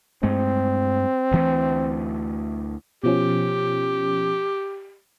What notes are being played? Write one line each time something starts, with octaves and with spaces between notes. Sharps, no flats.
G2 G#3 A3 C4
D2 E3 A3
B2 F3 C#4 G4